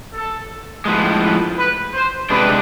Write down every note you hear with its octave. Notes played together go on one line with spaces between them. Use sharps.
A4
A2 F3 G#3 B4
B4
B4
C5
C3 G#3 D4 B4